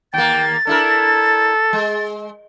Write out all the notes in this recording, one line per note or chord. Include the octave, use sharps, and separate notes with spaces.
D#2 A#3 G5 A6
D4 E4 A4 A#4
G#3